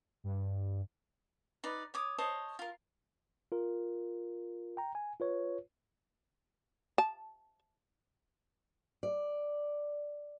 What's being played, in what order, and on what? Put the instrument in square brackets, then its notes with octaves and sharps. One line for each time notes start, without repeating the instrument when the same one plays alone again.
[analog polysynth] G2
[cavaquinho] D#4 B4 D5
C#5 D6 D#6
C5 C#5 D#5 A5
F4 A#4
[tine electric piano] F4 A#4
G5 A#5
G#5
F4 B4 C#5
[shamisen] A5
[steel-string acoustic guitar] D5